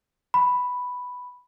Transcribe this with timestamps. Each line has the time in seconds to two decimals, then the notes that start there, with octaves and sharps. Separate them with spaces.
0.34 B5